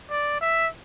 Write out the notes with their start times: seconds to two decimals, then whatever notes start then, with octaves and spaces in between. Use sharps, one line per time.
0.11 D5
0.41 E5